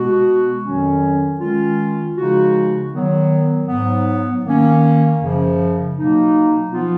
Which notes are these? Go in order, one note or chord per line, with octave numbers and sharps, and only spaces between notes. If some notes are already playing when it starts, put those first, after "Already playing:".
Already playing: B2 G#3 B3 F#4
F2 D#3 F#3 C#4
D#3 G#3 C#4 F4
C#3 F3 G#3 D#4 F#4
D#3 F#3 B3
G#2 F#3 B3
D#3 A#3 C#4
F#2 C#3 F3
B2 F#3 A#3 D#4
F3 B3 F4